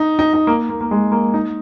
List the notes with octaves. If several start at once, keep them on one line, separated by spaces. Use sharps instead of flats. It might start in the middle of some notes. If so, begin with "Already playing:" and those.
Already playing: D#4
D#4
D#4
A#3
A#3
A#3
G#3
A#3
D#4